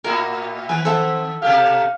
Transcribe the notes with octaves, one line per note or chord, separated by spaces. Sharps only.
A2 E4 F#4 A#4 D#5
E5
D#3 B4 G#5
C4 A4 E5 F#5
B2 A3 G4 F5